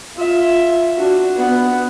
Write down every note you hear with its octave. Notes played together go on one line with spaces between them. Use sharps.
F4 E5
D4 F#4
B3 F#5